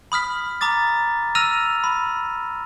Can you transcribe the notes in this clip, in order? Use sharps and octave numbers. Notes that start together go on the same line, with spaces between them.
B5 D#6 F6 B6
A#5 D6 D#6 A6
E6 F6 A#6 D#7 F7
B5